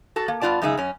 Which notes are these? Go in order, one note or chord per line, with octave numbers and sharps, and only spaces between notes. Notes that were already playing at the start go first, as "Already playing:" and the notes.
F#4 A4 A5
A#3
G2 B3 F4 D5 A5
F#2 C#3 G#3 D#4 F4 E5
F#2 C#4